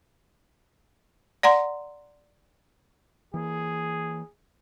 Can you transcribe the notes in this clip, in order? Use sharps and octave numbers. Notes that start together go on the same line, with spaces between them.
D5 F#5 A#5 C6
E3 A#3 G#4